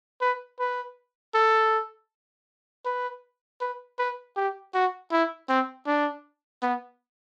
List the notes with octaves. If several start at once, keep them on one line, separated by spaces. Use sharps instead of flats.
B4
B4
A4
B4
B4
B4
G4
F#4
E4
C4
D4
B3